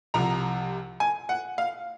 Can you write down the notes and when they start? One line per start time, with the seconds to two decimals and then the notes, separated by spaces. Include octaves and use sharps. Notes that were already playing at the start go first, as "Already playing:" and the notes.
0.14 C2 C3 F3 A#5
1.00 G#5
1.29 F#5
1.58 F5